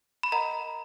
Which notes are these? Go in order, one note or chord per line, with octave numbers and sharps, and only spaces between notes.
B5
A#4 D#5 F#5 A#5